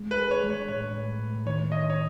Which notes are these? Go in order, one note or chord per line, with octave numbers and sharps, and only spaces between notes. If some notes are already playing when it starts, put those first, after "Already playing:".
Already playing: G#3
B4
G#4
C#5
G#3
C#5
A2 C#5
A2
A2
D#3 C#5
D#3 D#5
C#5